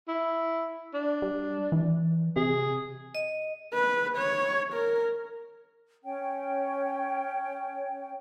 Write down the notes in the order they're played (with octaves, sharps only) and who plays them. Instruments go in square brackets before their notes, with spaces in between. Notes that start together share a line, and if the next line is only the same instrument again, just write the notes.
[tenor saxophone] E4
D4
[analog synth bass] G3
E3
[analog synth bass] C3 [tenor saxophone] G#4
[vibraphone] D#5
[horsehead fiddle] B4
C#5
A#4
[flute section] C#4 C#5 G5